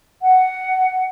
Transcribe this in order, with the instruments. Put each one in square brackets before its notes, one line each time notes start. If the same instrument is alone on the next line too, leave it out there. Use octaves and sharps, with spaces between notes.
[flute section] F#5